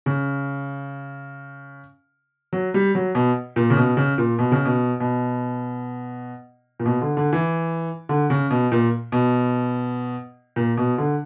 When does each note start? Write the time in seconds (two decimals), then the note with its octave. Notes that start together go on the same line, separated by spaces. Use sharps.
0.06 C#3
2.53 F#3
2.74 G3
2.95 F#3
3.15 B2
3.56 A#2
3.70 C#3
3.77 B2
3.97 C#3
4.18 A#2
4.39 B2
4.52 C#3
4.65 B2
5.00 B2
6.80 A#2
6.86 B2
7.02 D3
7.17 D3
7.33 E3
8.09 D3
8.30 C#3
8.51 B2
8.72 A#2
9.12 B2
10.56 A#2
10.77 B2
10.98 D3